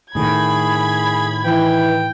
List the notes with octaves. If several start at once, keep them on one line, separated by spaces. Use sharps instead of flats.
A2 D#3 G#4 B5 G#6
E3 G5